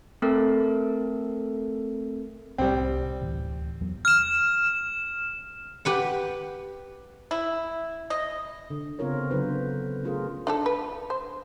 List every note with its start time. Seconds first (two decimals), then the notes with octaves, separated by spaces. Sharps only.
0.22 A3 C4 A4 A#4
2.58 C2 A2 G3 C4
3.21 D2 A2 E3
3.81 E2 F#3 B3
4.05 F6 E7
5.85 G4 B4 F#5
7.31 E4
8.10 D#5
8.70 D3
8.99 C#3 B3 C4 F4 A#4 C#5
9.30 D3 F#3 F4 B4 C5
10.04 A3 C#4 F4 G#4 A#4
10.47 D4 D#4 A4
10.66 B4
11.10 C5